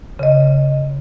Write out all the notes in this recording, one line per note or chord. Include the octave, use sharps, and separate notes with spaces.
C#3 D#5